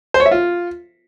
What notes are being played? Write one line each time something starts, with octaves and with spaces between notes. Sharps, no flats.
C5
C#5
E5
F4